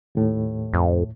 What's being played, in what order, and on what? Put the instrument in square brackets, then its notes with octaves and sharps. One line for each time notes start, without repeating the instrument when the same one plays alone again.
[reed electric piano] D#2 A2
[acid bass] F2